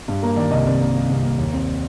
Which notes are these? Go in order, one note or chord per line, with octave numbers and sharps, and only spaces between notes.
G2
A#3 A#4
D#3 D5
C2 D#5
C3 D5
A#3
A#3
C2
A#3
D#2
C4